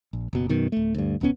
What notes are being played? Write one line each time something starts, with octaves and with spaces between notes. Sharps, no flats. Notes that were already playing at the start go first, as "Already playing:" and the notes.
A#1
F#1 B2
F#2 B2 D#3
D1 A3
D2 G2
D#1 C#2 B3 C#4